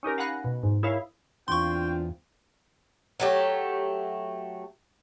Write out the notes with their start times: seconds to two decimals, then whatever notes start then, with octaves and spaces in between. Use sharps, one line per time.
0.03 C#4 D#4 G4 A#4
0.18 F5 F#5 G#5 B5 F#6 A#6
0.44 B2
0.63 G#2
0.83 E4 G#4 A#4 C#5 E5 F5
1.48 E2 C4 D4 F4 G5 C6 C#6
3.20 F#3 A3 G4